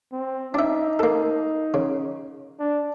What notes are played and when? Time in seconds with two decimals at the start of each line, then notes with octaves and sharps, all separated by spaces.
0.13 C4
0.54 D4 D#4 E5
0.99 A#3 A4
1.74 C#3
2.60 D4